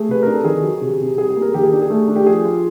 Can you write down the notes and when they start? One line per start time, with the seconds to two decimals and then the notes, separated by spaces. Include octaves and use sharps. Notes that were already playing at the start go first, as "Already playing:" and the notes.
Already playing: A3 G#4
0.08 C3 B4
0.23 D4 A#4
0.34 A4
0.44 D#3 G#4
0.63 F#3
0.81 C3
1.00 C3
1.17 G3 G#4
1.30 G#4
1.36 A#3
1.42 G#4 A#4
1.54 D#3 G4
1.63 G#4
1.71 D4 G4
1.81 G#4
1.90 A3
2.08 D4
2.16 G4
2.26 F3 G#4
2.45 F4